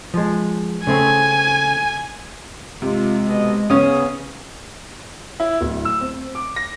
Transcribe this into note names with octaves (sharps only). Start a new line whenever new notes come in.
F3 G#3
C#3 A3 C4 G#5
C3 G#3 F4
F2 B2 D#5
C#3 B3 C#4 G#4 D#6 D#7
E4
D1
E6
C4
D6
A#6